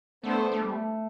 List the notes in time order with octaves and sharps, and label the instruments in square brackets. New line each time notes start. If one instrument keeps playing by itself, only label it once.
[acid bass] A3 [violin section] B3 D4 A4 C5
[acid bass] A3
G3
A3